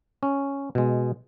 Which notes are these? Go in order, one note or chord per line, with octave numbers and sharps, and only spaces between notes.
C#4
B2 G#3